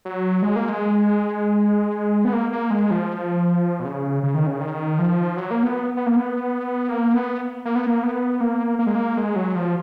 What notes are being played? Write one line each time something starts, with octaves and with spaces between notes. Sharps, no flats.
F#3
G#3
A#3
G#3
B3
A#3
A#3
G#3
F3
B2
C#3
C#3
D#3
C#3
D#3
F3
F#3
A#3
B3
B3
A#3
B3
A#3
B3
A#3
B3
A#3
B3
A#3
A#3
G#3
A#3
G#3
F#3
F3